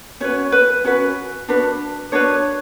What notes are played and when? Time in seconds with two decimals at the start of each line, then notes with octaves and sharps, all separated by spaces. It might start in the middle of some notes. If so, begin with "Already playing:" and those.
0.20 C#4 F#4 B4 C#5
0.52 B4
0.84 C#4 F#4 B4
1.48 D4 F#4 B4
2.12 D4 F#4 B4 C#5